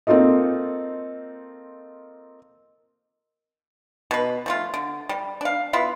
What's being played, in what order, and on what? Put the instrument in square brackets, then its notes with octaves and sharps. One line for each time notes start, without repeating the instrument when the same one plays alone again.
[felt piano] A#3 C4 D#4 F4 A4 D#5
[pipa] B2 B4
F3 A3 F4
D3
G3
D4 F5
B3 E4 F4 B4